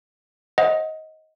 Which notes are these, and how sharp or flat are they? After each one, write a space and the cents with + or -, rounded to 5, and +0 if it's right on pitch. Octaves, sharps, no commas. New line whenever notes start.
C5 +40 D#5 +20 F#5 -15